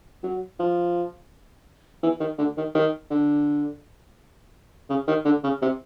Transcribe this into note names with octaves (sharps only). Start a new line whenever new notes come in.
F#3
F3
E3
D#3
D3
D#3
D#3
D3
C#3
D#3
D3
C#3
C3